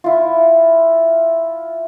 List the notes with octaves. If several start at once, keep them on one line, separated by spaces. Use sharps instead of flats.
E4 F4